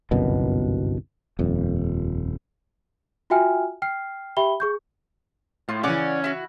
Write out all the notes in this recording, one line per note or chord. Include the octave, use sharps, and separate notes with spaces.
G1 C2 F#2 B2
D#1 F2
F4 F#4 E5 G5 G#5 F6
G5 F6 C7
G4 E5 G5 B5 G7
G#4 C#6 G6
A2 F4
C#3 E3 C#4 D5 F#5 D6
E4 F#4